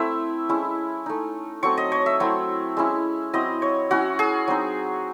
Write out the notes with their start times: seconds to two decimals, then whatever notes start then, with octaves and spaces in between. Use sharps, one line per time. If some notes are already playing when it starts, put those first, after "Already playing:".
Already playing: A3 C4 E4 E5
0.49 G#3 C#4 E4
1.06 A3 D#4
1.63 F#3 A3 C4 C#6
1.77 D#5
1.92 C#5
2.06 E5
2.20 F#3 A3 C4 E4
2.77 G#3 C#4 E4
3.33 F#3 C4 E4 D#5
3.62 C#5
3.91 F#3 C#4 E4 F#4
4.19 G#4
4.48 F#3 C4 D#4